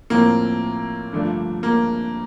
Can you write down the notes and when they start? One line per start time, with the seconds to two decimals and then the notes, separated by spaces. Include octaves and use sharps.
0.10 A2 F3 A#3 C4
1.13 G2 D3 F3 A3 D4
1.63 A#3